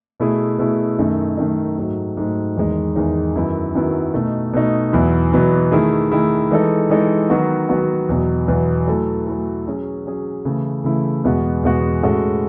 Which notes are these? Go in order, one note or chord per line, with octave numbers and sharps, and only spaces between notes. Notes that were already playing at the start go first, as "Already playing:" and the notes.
B2 A3 E4 G#4
B2 A3 E4 G#4
F#2 D#3 A3 D#4
F#2 D#3 A3 D#4
G#2 F#3 A3
G#2 F#3 A3
E2 D#3 G#3 D#4
E2 D#3 G#3 D#4
F#2 D#3 F#3 B3 E4
F#2 D#3 F#3 B3 E4
B2 A3 D#4
B2 A3 D#4
E2 B2 F#3 B3 E4
E2 B2 F#3 B3 E4
D#3 A3 E4 G#4
D#3 A3 E4 G#4
E3 G#3 D#4 A4
E3 G#3 D#4 A4
D#3 F#3 B3 F#4
D#3 F#3 B3 F#4
E2 B2 F#3 B3
E2 B2 F#3 B3
F#3 A3 E4 A4
F#3 A3 E4 A4
F#3 C#4 G#4
F#3 C#4 G#4
C#3 E3 A3 E4
C#3 E3 A3 E4
E2 B2 G#3 B3 F#4
E2 B2 G#3 B3 F#4
A2 G#3 C#4 F#4 A4